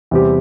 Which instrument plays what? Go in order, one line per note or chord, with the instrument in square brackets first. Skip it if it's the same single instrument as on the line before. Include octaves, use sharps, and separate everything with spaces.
[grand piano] E2 C3 G3 C4 G4